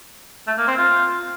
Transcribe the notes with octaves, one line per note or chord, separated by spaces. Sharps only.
A3
A#3
C4
F4